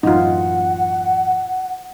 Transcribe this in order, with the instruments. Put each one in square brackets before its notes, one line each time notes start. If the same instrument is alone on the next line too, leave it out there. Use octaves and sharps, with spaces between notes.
[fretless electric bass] A1 F#2 [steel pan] D#4 F4 [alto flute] F#5